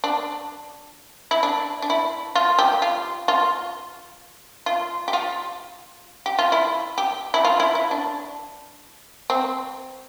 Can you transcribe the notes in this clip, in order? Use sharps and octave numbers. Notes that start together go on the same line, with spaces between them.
D4
E4
D4
D4
E4
F4
G4
F4
F4
F4
G4
F4
G4
F4
E4
G4
E4
F4
E4
E4
D4
C4